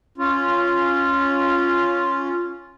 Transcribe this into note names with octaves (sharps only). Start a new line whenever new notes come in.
C#4 F4